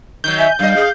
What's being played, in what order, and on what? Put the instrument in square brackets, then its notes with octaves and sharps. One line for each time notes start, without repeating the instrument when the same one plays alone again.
[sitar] D#3 F#3 [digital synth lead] G6
[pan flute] E5 [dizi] G#5
[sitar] G2 D#5 [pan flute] G3 [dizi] F5
[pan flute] G#4